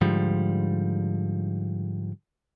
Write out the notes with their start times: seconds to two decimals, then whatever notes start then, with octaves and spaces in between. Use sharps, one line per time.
0.01 G#2 D3 F3 G3